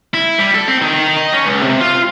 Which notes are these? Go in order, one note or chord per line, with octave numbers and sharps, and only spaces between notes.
E4
G3
A4
C4
D#3
D#3
D#5
C#4
C#2
C3
F4